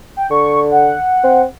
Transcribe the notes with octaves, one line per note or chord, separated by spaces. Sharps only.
G5
D3 C#6
F#5
C4